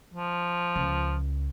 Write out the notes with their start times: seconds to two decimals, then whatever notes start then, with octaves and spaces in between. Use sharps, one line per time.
0.14 F3
0.76 C#2